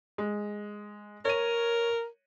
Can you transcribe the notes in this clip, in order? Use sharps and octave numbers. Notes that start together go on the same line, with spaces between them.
G#3
A#4 C#5 D#7